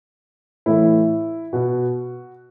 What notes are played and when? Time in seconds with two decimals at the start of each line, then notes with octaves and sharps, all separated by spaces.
0.66 A2 E3 E4
1.53 B2 F#4